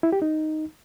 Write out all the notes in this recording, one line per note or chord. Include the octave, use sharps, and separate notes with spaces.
E4
G4
D#4